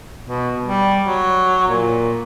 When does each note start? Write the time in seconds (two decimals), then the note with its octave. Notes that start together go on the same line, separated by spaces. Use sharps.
0.23 B2
0.63 G3
1.04 F#3
1.68 A#2